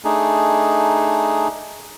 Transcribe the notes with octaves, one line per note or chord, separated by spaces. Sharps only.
A3 D4 D#4 G#4